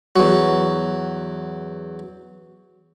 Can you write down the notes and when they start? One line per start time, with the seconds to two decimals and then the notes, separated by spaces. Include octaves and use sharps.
0.16 E2 F#3